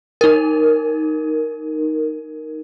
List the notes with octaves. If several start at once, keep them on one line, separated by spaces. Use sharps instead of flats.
D#4 A#4